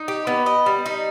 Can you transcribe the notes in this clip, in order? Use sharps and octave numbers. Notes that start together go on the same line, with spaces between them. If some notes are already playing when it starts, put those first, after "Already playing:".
Already playing: D#4
G4
B3
D#5
G3
D#4